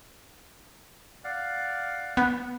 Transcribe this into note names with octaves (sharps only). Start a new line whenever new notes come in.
D5 F5 F#5
B3